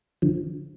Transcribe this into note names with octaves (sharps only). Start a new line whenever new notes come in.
D3 F3